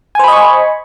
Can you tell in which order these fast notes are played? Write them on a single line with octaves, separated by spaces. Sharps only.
G#5 C5 B5 D#5 C#6